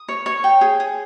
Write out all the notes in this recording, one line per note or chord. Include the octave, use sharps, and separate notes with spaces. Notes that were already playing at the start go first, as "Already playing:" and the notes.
Already playing: D#6
C#5
C#5
G5
G#4
G#4